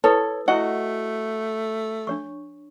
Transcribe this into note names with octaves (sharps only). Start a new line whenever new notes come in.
E4 A4 B4 C#5 D#6
A3 E4 F#4 D#5 F#5 G#5
D4 C#5 C#6